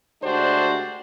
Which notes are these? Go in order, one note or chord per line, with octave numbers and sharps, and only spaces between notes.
D2 G#3 D4 F#4 G4 C5